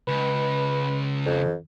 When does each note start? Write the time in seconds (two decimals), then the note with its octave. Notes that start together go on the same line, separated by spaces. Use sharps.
0.08 C#2 B4
1.26 F2